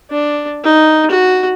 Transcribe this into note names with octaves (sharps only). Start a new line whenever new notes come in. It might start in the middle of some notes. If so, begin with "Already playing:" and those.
D4
D#4
F#4